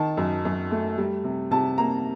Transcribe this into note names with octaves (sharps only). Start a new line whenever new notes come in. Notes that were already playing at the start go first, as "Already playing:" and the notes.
Already playing: D#3 A5
F#2
F#2
A3
G3
C3
C3 A5
A#3 A#5